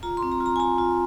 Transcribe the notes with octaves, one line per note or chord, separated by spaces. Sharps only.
F4 A#5
C6
C4
A#5
F4
A#5
G#5
F4 A#5
F4